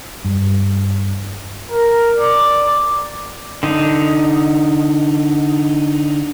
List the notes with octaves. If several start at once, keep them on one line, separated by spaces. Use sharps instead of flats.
G2
A#4
D5
D3 D#4